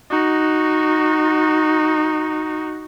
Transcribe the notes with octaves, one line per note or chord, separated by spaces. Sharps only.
D#4 F#4